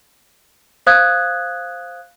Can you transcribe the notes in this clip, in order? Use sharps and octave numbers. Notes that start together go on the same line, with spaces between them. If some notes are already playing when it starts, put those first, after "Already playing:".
C5 F5 D#6 F#6 G#6